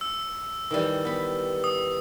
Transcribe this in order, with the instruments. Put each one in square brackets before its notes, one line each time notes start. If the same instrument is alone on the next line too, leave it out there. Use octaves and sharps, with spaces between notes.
[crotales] E6
[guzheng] D#3 E3 G3
B3 B5
[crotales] D#6